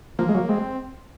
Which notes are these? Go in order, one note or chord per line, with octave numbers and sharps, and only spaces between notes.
F3 A#3
G#3
F#3
G#3 C4